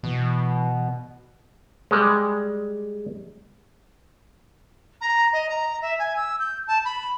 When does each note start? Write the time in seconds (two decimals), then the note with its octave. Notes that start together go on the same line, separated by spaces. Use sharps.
0.03 B2 E3
1.91 G3 G#3
5.01 A#5
5.33 D#5
5.49 A#5
5.82 E5
5.99 G#5
6.17 E6
6.40 G6
6.67 A5
6.85 B5